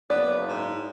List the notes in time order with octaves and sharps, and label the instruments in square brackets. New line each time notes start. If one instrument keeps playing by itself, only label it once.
[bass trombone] F#1 [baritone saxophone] B3 [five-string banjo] D5
[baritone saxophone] G#2